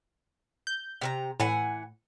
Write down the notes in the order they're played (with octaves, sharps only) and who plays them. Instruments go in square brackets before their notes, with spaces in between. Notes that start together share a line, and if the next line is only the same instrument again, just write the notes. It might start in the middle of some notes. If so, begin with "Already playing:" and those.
[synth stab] G6
[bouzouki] C3 B4 A#5
[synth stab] A2 [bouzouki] E3 F#5 G#5